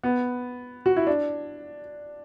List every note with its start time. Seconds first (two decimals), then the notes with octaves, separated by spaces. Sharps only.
0.03 B3
0.86 F#4
0.96 E4
1.07 D4